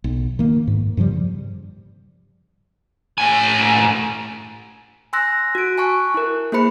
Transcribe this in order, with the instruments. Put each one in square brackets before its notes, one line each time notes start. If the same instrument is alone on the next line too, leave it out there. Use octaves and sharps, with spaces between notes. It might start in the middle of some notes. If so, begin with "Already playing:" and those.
[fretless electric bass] B1
D#3 A#3
G#2
G2 C#3 F3 G3
[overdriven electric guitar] A2 G#5
[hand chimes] G#5 C6 E6 F#6 A#6
F#4 D7
G#5 A5 C#6 F#6
E4 A#4
A#3 E4 G#4 C5 B5 C#7